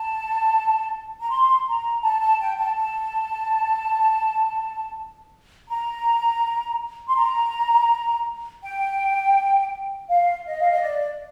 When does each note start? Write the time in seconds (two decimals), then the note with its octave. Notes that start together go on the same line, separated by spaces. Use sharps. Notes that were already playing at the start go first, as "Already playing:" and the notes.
Already playing: A5
1.21 A#5
1.30 C6
1.68 A#5
2.03 A5
2.21 A5
2.40 G5
2.58 A5
2.77 A5
5.69 A#5
7.09 C6
7.16 A#5
8.63 G5
10.09 F5
10.46 D#5
10.60 F5
10.71 D#5
10.82 D5